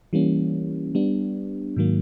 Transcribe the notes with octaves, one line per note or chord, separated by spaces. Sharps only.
E3 G3 A#3 C#4
G3 B3 D4
G#2 D#3 F#3 A#3